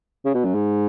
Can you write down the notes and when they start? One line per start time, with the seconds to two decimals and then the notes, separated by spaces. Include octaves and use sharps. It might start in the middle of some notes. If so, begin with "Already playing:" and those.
0.25 C#3
0.34 B2
0.45 F#2
0.55 G#2